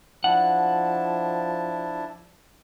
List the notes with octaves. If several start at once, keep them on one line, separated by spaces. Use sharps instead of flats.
F3 D4 E4 F#5 A5